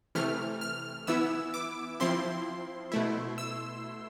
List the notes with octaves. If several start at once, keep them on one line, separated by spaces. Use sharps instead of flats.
C3 E3 A3 F6
F6
E3 B3 E4 E6
D6
F3 C4 E4 C6
B2 A3 E4
E6